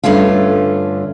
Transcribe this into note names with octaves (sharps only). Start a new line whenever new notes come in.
G2 D3 A3 C#4 F4